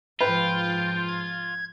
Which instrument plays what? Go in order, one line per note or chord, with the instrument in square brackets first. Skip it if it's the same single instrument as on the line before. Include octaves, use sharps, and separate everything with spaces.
[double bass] G#2 F3 [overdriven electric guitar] F4 [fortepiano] B4 [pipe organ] G5
[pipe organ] G#6